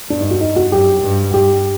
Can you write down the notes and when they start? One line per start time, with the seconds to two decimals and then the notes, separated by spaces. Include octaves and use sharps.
0.10 G2 D4
0.21 D#4
0.31 F#4
0.41 D#4
0.56 F#4
0.72 F#2 G4
1.03 G2
1.34 G2 G4